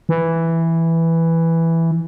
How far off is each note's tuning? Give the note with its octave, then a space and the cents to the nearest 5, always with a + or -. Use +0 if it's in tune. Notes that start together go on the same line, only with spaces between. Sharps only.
E3 +0